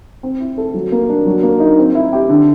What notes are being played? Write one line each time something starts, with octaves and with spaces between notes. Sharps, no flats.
C4
E4
A4
F#3
A#3
D4
F#3
A#3
D#4
C4
E4
G4
D3